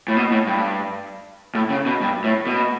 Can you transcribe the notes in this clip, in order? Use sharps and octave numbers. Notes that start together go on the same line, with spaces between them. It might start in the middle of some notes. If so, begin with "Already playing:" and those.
A2
B2
A2
G2
A2
C#3
B2
G2
A2
B2